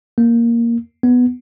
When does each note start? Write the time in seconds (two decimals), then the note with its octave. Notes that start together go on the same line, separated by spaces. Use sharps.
0.18 A#3
1.03 B3